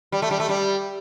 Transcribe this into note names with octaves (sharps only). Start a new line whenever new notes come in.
G3
A3
G3
A3
G3